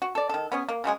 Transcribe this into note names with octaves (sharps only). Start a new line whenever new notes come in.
F#4
A4 D5
D#3 A4
B3 C#4 G#4
A#3
C#3 F#3 G#3 G#4